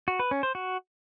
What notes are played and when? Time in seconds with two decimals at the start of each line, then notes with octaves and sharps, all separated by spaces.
0.08 F#4
0.19 B4
0.31 C#4
0.43 C5
0.55 F#4